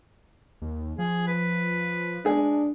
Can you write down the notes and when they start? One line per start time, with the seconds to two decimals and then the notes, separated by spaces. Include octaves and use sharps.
0.62 D#2
0.98 F3 G#4
1.28 B4
2.25 G#3 D4 G#4